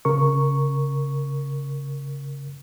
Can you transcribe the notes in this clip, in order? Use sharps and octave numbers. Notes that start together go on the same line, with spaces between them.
C#3 A#4 C#6